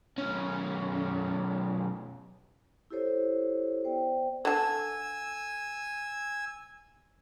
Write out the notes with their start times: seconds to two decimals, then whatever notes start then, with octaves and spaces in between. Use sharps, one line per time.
0.18 B1 C#4
2.91 E4 G4 A4 C5 C#5
3.84 B3 C5 D5 G5
4.45 D3 G#5 A5 E6